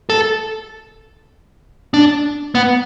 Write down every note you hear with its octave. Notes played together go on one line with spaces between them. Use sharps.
A4
D4
B3